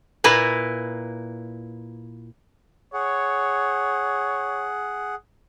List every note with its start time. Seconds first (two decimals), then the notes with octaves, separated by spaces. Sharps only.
0.24 A#2 A#3 E4 B4
2.93 G#4 C#5 F#5